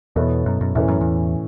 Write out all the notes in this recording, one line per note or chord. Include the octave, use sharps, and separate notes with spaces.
E2 B2 B3 E4 A4 C#5
F#2
F#2
E2 A2 E3 C#4 A4 C#5
F#2
E2